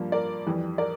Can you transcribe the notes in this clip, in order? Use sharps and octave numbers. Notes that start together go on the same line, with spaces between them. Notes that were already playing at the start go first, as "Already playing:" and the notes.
Already playing: G2 F3 A#3
A#4 D5
F2 E3 G3
A#4 D5